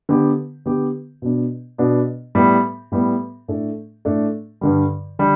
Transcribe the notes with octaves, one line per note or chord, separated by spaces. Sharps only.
D3 B3 G4
D3 B3 G4
B2 B3 D4
B2 B3 D4
A2 G3 B3
A2 G3 B3
A2 A3 D4 A4
A2 A3 D4 A4
G2 D3 G3
D3 G3